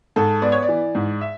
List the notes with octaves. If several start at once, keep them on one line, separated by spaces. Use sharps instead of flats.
G#2 A4
B3 D5
C#5
D5
E3
G#2
E5